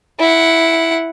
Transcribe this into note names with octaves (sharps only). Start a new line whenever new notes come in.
E4 F#5